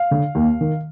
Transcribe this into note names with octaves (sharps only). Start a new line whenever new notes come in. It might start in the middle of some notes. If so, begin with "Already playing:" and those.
Already playing: F5
D3
D#2
D#3